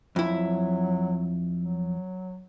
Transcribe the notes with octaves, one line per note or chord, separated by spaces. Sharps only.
F2 F#3 E4
F#3